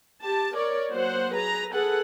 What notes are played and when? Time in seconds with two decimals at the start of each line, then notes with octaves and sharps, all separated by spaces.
0.22 G4 A5
0.54 A#4 C#5 D5
0.91 F#3 A#3 C5 F#5
1.34 G#4 B4 A#5
1.72 G#4 A4 B4 F#5